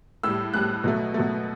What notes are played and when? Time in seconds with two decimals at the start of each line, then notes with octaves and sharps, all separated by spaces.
0.23 A2 G3 E6
0.54 A2 G3 F#6
0.84 B2 F#3 A3
1.14 B2 F#3 A3